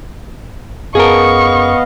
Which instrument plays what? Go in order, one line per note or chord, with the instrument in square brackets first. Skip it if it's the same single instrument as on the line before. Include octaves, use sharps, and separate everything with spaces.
[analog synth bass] F#2 [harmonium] B3 D#5 F5 [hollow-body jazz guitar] G#4 A#4 [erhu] C#6